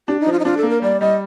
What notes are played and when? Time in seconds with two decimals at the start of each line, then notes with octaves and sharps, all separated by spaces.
0.08 D4 G4
0.20 D#4
0.26 F3
0.32 F4
0.39 D#4
0.45 D4 F4
0.57 A4
0.63 A#3
0.70 A#4
0.82 G3 D5
1.00 G3 D#5